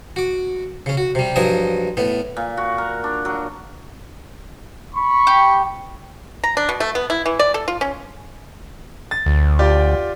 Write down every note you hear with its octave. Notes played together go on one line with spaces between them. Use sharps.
F#4 D6
C#3 C#4
F#4
C3 G3
G2 F3 F#3 D#5 G#5 D#6
A2 B3
A#2
F#4
A#4
D4
F#3
B5 C#6
G4
A#5
D4
B2
A3
B3
E4
E3
D5
A4
F4
C#4
A6
D2
F4 G4 D5